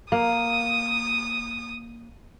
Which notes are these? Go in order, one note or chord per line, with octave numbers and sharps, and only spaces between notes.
A#3 D#6